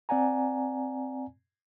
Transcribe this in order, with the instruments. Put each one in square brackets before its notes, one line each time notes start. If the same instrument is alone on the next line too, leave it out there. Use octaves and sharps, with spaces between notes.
[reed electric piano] C4 D5 F#5 G#5 A#5